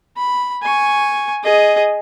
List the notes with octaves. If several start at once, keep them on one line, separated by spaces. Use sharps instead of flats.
B5
G#5 C#6
G#4 D#5